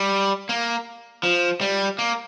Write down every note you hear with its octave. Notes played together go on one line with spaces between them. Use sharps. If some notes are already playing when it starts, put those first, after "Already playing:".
Already playing: G3
A#3
F3
G3
A#3